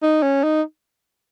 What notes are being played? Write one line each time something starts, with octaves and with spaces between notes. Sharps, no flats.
D#4
C#4
D#4